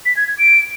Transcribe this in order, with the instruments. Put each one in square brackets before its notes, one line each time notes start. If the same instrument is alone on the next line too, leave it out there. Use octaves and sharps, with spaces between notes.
[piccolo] B6
G#6
G#6
D7